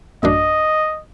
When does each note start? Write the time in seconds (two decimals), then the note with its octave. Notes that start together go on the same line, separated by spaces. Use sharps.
0.23 A1 F#2 D4 D#5